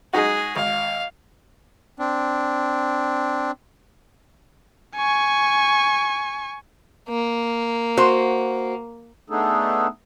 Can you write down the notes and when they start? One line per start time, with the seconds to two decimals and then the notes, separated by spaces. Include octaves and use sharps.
0.13 G#3 D#4 F#4 G#4
0.57 G#1 F5
1.99 C4 D4
4.96 G#5 C#6
7.09 A#3
7.97 F#4 C5
9.30 A3 B3 D4 D#4 G#4 A4